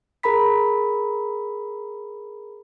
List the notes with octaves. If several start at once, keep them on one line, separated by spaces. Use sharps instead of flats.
G#4 A#4 A#5 B5 B6